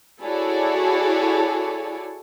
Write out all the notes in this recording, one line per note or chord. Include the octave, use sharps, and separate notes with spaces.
E4 F#4 G#4 A4 C#5 D5